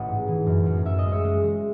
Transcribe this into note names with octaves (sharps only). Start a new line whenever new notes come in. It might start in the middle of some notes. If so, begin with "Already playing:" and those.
Already playing: A1 D#5 F#5
G#2
E3
F#2
F#2
F#2 E5
D#5
G#3
C#5 E5
G#3
G#3